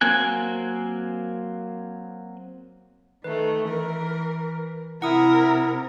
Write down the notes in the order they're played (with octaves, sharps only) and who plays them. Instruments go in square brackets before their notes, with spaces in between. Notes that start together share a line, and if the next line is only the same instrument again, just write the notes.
[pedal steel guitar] F#3 A#3 C4 G#5 F#6
[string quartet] D#3 A3 [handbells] B4
[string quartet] E3 A#4
[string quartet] C3 [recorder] E4 [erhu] A#4 [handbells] F#5 D#6